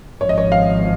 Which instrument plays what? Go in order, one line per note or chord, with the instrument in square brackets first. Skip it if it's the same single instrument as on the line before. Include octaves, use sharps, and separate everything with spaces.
[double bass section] G#1 G#2 F3 [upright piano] C#5
[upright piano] D#5
C#5
F5